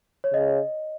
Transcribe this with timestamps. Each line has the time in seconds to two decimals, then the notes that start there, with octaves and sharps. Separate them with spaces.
0.24 C#5
0.34 C#3 D#5